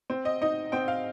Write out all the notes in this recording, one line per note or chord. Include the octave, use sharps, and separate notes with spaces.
C4
D#5
D#4 D#5
C4 G5
F5